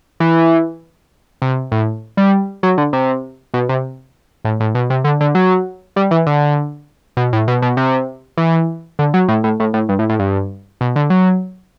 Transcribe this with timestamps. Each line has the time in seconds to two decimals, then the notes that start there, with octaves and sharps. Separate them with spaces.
0.20 E3
1.42 C3
1.72 A2
2.17 G3
2.63 F#3
2.78 D3
2.93 C3
3.54 B2
3.69 C3
4.45 A2
4.60 A2
4.75 B2
4.90 C3
5.04 D3
5.21 D3
5.35 F#3
5.96 G3
6.11 E3
6.26 D3
7.17 B2
7.33 A2
7.48 B2
7.62 B2
7.77 C3
8.37 E3
8.99 D3
9.14 F#3
9.28 A2
9.44 A2
9.60 A2
9.74 A2
9.89 G2
9.99 A2
10.09 A2
10.19 G2
10.81 B2
10.96 D3
11.10 F#3